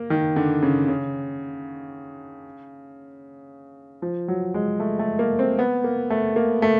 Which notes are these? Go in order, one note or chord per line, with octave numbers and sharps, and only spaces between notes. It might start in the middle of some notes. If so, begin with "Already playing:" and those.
Already playing: A#3
D#3
D3
C#3
C#3
F3
F#3
G#3
A3
A3
A#3
C4
B3
A#3
A3
A#3
A3